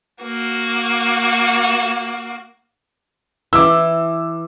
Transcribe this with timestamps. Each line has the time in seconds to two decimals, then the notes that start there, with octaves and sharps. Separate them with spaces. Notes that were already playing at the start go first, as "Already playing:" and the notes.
0.23 A#3 F#4
3.53 E3 D6 E6